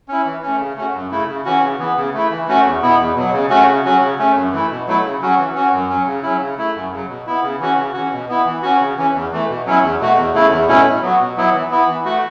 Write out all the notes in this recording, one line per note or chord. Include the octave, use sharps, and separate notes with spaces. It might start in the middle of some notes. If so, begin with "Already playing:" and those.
C#4 E4
E3
A3 C#4
C#3
A3 C#4 F#4
F#2
C#3 A3 E4
C#3
E3 C#4 F#4
C#3
E3 B3
C#3
A3 E4
E3
A3 C#4 F#4
E2
B2 B3 E4
E2
B2 F#3
C#3
A3 C#4 F#4
C#3
F#3 C#4 F#4
C#3
A3 C#4
F#2
E3 A3 E4
B2
F#3 A3 E4
C#3
F#3 C#4 F#4
E3
C#4 F#4
F#2
F#3 C#4
C#3
F#3 C#4 E4
C#3
A3 E4
F#2
C#3 F#3
B2
B3 E4
C#3
E3 C#4 F#4
C#3
E3 C#4 F#4
B2
B3 E4
E3
C#4 F#4
C#3
E3 C#4
E2
E3 A3
B2
F#3 C#4 E4
E2
B2 A3 F#4
E2
C#3 A3 E4
E2
B2 A3 C#4 E4
A2
F#3 B3 F#4
B2
F#3 B3 E4
E3
B3 E4
E3
A3 F#4